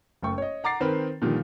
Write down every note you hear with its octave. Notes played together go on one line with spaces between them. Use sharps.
F#1 A3 G5 C#6
C#5 D#5
F#5 A#5 D6 A6 C7
D#3 C4 A#4 B4
A#2 D3 D#3 F3 G3